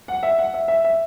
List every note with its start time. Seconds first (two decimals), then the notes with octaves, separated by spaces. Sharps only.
0.08 F#5
0.23 E5
0.38 F#5
0.54 E5
0.68 E5
0.84 E5